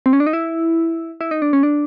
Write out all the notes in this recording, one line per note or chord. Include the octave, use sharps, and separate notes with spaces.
C4
C#4
D4
D#4
E4
E4
D#4
D4
C#4
D4